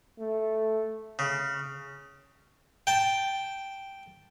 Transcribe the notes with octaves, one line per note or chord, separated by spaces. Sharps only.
A3
C#3
G5 A5